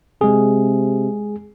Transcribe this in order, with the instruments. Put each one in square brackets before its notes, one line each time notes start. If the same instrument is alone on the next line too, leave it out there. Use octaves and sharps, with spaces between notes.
[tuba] C3 [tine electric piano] G#3 G#4